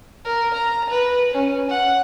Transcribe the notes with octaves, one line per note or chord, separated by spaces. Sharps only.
A#4
A#5
B4
C#4
F#5